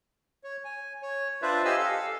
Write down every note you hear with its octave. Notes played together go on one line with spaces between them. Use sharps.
C#5
G#5
C#5
D4 F4 B4 C5 D5 E5
G4 D#5 F5 G#5 E6
A4 F5